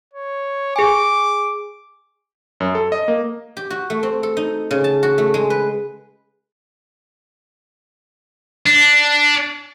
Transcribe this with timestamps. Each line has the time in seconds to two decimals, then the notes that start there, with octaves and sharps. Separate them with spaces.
0.13 C#5
0.76 G#4 G#5 D6
2.60 F#2
2.75 A4
2.92 D#5
3.08 A#3
3.57 G4
3.70 F#4
3.90 A3
4.03 C4
4.23 A4
4.37 D#4
4.71 C#3
4.84 A5
5.03 F#4
5.18 A3
5.34 G#3
5.50 B4
8.66 D4